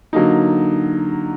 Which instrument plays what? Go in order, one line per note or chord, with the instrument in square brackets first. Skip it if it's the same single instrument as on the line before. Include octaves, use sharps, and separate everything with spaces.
[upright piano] D3 F#3 A#3 D#4